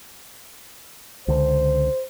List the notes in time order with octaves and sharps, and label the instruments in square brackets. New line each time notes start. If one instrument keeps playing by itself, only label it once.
[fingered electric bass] C#2 D3 [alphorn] C5